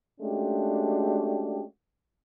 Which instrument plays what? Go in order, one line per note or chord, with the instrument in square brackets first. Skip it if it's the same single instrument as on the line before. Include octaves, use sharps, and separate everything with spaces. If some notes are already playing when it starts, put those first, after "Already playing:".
[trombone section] G#3 A3 C#4 D4 F#4 G4